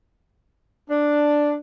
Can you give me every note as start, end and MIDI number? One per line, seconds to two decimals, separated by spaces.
0.88 1.55 62